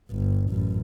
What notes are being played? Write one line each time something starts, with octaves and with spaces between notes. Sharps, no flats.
G1
A1 F#2